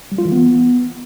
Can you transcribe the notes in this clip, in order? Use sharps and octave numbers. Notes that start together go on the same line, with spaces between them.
G3
F4
E3
B3